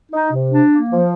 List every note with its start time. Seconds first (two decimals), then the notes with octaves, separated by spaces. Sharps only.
0.12 D#4
0.32 C3
0.52 D4
0.71 A#3
0.90 F3